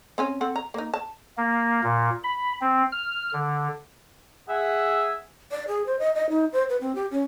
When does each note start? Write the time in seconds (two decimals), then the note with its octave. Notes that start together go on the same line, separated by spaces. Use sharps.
0.18 C4 C#4 G#5
0.41 C4 A4 F#5
0.56 A#5
0.74 A#3 D#4
0.94 A5
1.37 A#3
1.83 A#2
2.24 B5
2.61 C4
2.92 F6
3.33 D3
4.49 G#4 E5 F#5
5.51 D5
5.68 G#4
5.86 C5
5.99 D#5
6.15 D#5
6.30 D#4
6.53 C5
6.69 B4
6.81 C4
6.95 G4
7.11 C#4